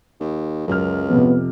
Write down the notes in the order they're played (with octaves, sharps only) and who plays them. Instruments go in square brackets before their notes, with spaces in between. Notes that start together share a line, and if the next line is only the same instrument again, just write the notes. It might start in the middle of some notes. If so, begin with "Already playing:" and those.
[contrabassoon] D#2
[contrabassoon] C#2 [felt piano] F#2 A#4 F6
[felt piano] F2 C3 [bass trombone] B3